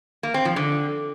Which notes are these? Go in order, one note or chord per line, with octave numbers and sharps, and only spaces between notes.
A#3
C4
F3
D3